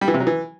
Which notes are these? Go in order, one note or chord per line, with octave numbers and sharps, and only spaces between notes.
G3
E3
C3
F#3
E3